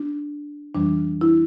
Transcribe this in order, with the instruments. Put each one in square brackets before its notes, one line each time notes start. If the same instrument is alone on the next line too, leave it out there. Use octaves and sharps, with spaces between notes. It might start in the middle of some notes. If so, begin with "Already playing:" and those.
Already playing: [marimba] D4
F2 E3 G3 D4
E4